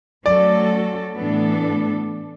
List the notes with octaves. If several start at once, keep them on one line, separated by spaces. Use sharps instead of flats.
F#3 A3 C#4 F#4 A4 D5
A2 E3 B3 D4 A4